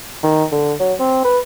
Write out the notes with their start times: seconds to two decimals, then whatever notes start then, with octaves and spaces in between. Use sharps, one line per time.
0.23 D#3
0.52 D3
0.80 F#3
0.99 C4
1.25 B4